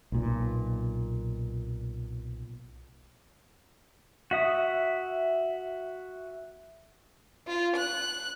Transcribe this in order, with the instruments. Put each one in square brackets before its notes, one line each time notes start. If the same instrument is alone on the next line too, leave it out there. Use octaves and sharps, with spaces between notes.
[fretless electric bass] B1 A#2
[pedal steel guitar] F#4 E5 D#6
[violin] F4
F#6